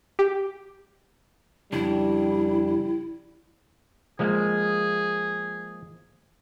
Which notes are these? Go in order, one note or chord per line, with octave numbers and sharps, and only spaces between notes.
G4
F2 C#3 G3 D4 E4
F3 G#3 A#3 G#4